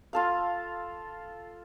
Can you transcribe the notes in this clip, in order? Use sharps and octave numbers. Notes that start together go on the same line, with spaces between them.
F4 A4 F5